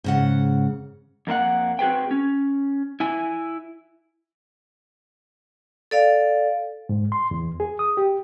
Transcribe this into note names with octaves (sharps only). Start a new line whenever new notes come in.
G#2 C#3 F#5
F2 A#3 E4 F#5
C4 F#4 G#4 B4 G5
C#4
E4 G#5
A4 D5 F5
G#2
C6
E2
G#4
D#6
G4